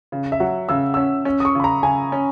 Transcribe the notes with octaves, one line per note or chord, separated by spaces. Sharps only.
C#3
E5
F#3 F#5
C#3 E6
C#4 E6
C#4
D#6
C#6
C#3 B5
A#5
C#3 G#5
C#4